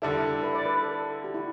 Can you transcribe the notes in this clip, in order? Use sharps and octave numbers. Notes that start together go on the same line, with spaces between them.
D3 G3 E4 A4 D5
B4
D5
B4
A4
G4
E4